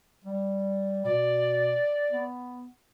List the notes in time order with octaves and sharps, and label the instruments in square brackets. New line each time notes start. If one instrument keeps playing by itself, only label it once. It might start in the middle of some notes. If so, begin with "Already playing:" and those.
[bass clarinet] G3
[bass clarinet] B2 [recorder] D5
[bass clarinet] B3